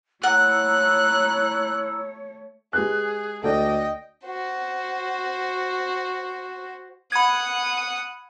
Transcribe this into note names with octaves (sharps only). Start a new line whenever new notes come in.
A3 E4 C#5 F#5 A#5 E6 F#6
G#3 G4 G#4 B4 F#6
D2 A4 D5 D#5 G5
F#4 C5
F#5 B5 D#6 G#6